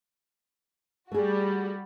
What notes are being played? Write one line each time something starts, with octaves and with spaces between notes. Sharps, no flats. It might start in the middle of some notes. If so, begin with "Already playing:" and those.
G3 A3 F#4 G#4